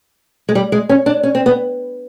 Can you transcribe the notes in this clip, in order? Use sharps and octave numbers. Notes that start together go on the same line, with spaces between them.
G#3
G3
G#3
C#4
D4
C#4
C4
B3